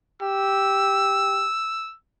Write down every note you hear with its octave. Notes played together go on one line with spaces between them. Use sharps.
G4 E6